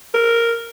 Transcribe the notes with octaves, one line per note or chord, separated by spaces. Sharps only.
A#4